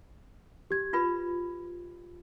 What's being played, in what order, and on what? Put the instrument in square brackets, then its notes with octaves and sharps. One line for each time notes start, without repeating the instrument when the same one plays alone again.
[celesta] G4 G#6
[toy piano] F4 B4 B5